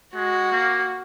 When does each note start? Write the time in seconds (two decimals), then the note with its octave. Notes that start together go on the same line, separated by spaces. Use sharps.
0.15 G#3 F#4
0.52 A#3